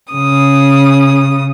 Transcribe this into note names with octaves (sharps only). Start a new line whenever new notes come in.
C#3 D#6